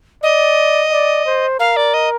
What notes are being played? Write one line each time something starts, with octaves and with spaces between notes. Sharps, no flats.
D5 D#5
D5
C5
A#4 F5
D5
D#5